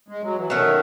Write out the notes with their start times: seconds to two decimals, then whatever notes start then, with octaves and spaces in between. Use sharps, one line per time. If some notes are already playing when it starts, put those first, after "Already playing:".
0.08 G#3
0.23 F#3
0.36 E3
0.50 D#3 F#3 A3 C#4